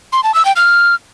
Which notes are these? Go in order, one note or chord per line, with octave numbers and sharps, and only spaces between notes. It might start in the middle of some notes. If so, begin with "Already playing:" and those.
C6
A5
E6
G5
F6